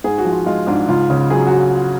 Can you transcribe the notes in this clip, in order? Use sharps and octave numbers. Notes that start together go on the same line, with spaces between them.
G#2 G#4
F#4
F3
F4
G#3 F4
G#2 D4
C#2 F4
C#3
F#3 G#4
F#4